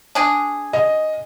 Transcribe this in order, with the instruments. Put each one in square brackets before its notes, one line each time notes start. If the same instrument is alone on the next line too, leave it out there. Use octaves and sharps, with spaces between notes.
[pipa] D4 G#4
[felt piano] D#5